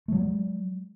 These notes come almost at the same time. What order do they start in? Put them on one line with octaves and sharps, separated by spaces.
A3 F#3 G#3